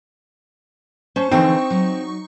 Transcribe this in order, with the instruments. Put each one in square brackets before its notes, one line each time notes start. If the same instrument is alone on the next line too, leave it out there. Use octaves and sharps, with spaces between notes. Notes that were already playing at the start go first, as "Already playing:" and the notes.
[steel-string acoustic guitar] C#4 [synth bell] C5 A5 C#6
[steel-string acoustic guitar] D3 E3 F3 [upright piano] C4 [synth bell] D#4 C#6
[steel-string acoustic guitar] F#3